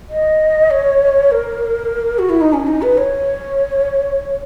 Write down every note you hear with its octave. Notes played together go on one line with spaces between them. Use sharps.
D#5
C#5
A#4
F#4
E4
D#4
C#4
D#4
B4
C#5